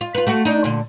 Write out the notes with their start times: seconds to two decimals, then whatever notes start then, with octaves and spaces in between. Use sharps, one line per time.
0.01 F4
0.15 F4 B4
0.27 A3 F#4
0.45 D4 D#4
0.64 A#2 D3